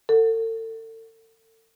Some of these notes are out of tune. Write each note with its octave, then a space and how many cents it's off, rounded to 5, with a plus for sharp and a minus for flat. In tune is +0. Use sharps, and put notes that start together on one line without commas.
A4 +35 F#5 +0